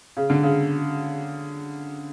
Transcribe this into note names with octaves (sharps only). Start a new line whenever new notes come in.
C#3
D3
C#3